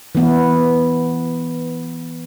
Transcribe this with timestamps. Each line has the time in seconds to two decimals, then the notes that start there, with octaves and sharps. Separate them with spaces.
0.15 E3 B3